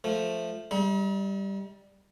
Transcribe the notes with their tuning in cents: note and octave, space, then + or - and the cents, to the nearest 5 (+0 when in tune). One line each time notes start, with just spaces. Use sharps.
F3 +0 A3 +0
G3 +0 D#4 +45 A#5 +45